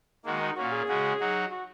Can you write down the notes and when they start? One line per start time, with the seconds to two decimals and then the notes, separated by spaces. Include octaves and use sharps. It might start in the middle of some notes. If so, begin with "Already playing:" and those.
0.25 D#3 G#3 A#3 F#4
0.41 D#4
0.56 A#2 A#3 C#4 F#4
0.72 G#4
0.87 C#3 G#3 C#4 F#4
1.20 F#3 D#4 F#4
1.51 F#4